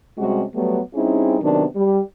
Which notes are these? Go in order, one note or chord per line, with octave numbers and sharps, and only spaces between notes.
C3 G3 G#3 C#4 F#4
F#3 G3 A3 B3
G3 C4 C#4 D#4 E4 G#4
C3 D#3 F#3 B3 D4
G3